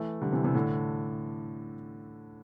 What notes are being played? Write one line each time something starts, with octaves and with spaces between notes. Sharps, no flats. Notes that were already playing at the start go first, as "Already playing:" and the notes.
Already playing: E3 A3
D3 G3
C3 E3
C3 E3
A2 D3